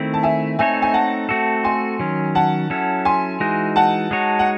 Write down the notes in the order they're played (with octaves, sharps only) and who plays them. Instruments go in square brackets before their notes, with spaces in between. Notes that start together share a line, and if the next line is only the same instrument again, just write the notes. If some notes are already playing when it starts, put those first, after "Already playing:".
Already playing: [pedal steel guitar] D#3 A3 C4 E4
[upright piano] A5
E5 G#5
[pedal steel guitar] A3 C4 D#4 A4 C#5 [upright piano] E5 G#5
[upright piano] G#5
F#5 A5
[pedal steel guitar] A3 C4 F#4 A4
[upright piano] G#5 C6
[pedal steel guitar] D#3 F#3 C#4
[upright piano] F#5 A5
[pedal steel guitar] F#3 C#4 E4 A4
[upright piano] G#5 C6
[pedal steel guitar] E3 G#3 D#4 F#4
[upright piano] F#5 A5
[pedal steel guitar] G#3 D#4 F#4 C#5
[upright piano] F#5